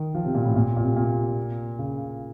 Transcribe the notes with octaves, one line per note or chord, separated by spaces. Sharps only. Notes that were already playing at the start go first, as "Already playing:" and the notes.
Already playing: D#3
F3
C3
A#2
A2
A#2
A#2
C3
A#2
C#3